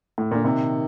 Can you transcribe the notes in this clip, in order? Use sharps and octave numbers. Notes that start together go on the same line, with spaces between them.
A2
A#2 D3
C3 D#3